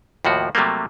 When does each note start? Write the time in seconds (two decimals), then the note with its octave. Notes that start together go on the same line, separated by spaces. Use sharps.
0.25 D#2 A2 F3 F#4
0.55 C3 F#3 G3 A3 A#3